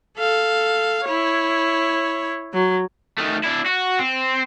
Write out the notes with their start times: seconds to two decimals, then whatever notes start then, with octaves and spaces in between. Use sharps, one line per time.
0.18 A4 F5
1.05 E4 C#5
2.54 F#3
3.18 D#3 A3
3.44 D4 E4
3.66 F#4
3.99 C4